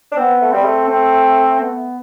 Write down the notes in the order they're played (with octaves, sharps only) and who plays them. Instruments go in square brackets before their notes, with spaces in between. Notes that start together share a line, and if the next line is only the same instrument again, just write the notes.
[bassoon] D4
[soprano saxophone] B3 [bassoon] C4
[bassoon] A3
[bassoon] G3 [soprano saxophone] C4
[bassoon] A3
[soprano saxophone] C4
B3